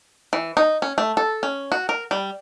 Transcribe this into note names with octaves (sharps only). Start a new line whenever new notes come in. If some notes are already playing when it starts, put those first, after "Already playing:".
E3
D#4
C#4
A3
A4
C#4
F#4
A#4
G3